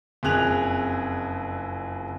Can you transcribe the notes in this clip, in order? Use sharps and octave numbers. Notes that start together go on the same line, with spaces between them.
F#1 F2 G#4 F#6 F7